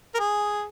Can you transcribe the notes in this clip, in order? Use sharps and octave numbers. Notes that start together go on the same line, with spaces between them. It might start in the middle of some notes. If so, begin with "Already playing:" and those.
A#4
G#4